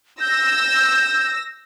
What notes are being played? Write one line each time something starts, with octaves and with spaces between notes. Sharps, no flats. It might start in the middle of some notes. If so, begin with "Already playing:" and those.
E6 G6 A#6